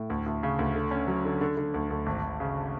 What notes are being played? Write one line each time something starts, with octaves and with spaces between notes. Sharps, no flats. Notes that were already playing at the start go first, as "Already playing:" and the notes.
Already playing: A2
D2
D2
C#3
D2
D3
C#4
F#3
D3
D3
D3
D2
D2
G#1
G#1
C#3